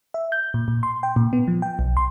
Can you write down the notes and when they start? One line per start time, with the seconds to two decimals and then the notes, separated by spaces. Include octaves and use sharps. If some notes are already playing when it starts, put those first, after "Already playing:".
0.14 E5
0.32 G6
0.54 A#2
0.68 A#2
0.83 C6
1.03 G5
1.16 A#2
1.33 B3
1.48 F3
1.62 G5
1.79 B1
1.97 C6